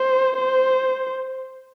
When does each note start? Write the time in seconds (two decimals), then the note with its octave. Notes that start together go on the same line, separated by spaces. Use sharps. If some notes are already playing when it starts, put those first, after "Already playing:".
Already playing: C5
0.37 C5